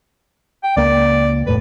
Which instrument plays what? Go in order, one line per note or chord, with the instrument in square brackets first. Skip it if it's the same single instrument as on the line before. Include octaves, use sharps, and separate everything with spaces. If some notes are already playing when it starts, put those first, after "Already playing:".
[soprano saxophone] G5
[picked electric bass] C#2 A#3 [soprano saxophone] D5
[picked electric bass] E1 A2 [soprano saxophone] B4